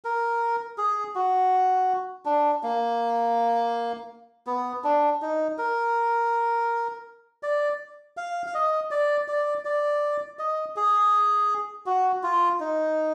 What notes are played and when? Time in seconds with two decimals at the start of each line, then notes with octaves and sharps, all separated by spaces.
0.04 A#4
0.78 G#4
1.15 F#4
2.26 D4
2.63 A#3
4.47 B3
4.84 D4
5.22 D#4
5.58 A#4
7.43 D5
8.17 F5
8.46 F5
8.54 D#5
8.91 D5
9.28 D5
9.65 D5
10.39 D#5
10.76 G#4
11.86 F#4
12.23 F4
12.60 D#4